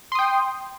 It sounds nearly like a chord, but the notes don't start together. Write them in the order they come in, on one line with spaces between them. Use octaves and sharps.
C6 D#6 G5